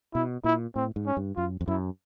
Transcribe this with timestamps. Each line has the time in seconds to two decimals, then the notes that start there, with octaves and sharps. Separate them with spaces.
0.14 B2 E4
0.44 A#2 E4
0.75 A2 C4
0.96 G#2
1.07 C#4
1.17 G2
1.36 F#2 F4
1.61 F2
1.67 F#2 E4